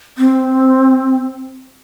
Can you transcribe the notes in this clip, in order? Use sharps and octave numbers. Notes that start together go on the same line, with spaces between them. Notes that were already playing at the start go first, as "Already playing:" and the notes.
C4